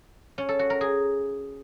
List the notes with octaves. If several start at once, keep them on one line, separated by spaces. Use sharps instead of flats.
C#4
A4
F#4
A#4
G#4